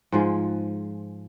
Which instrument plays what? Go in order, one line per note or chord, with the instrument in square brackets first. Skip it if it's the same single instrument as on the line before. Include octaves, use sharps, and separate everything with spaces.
[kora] G#2 F3 G#3